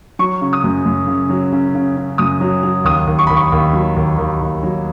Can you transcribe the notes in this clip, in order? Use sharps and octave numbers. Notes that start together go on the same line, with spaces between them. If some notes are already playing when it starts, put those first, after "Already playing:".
F#3 C#6
C#3
D#6
F#2
F#2
C#3
F#3
C#3
C#3
C#3
F#2 D#6
F#3
F#3
D#2 D#6
D#2
C#6
D#2 B5
C#6
D#2
F#3
D#2
D#2
D#2
F#3